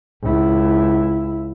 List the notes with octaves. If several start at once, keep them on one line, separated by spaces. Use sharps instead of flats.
C#2 E4